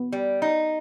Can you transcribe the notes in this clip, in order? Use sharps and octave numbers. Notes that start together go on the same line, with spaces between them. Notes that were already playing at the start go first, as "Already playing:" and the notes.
Already playing: B3
G3
D#4